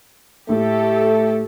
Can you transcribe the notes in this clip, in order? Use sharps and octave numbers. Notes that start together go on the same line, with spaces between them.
A2 A3 G4 A4